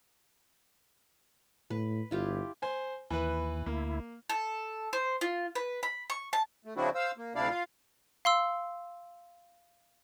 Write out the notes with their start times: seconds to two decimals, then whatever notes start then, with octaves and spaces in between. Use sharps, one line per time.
1.70 A2 B4
2.11 G1 E4 F4 G4
2.62 C5 G#5
3.10 D#2 E3 B4
3.66 D2 A#3 E4
4.29 A4
4.93 C5
5.21 F4
5.55 B4
5.83 B5
6.10 C#6
6.33 A5
6.65 A3
6.77 C#3 F3 C4 D4 E4 F#4
6.95 C5 F5 E6
7.17 A#3
7.35 D2 C3 D4 E4 D5 F5
7.49 F4 F5
8.25 F5 C6 E6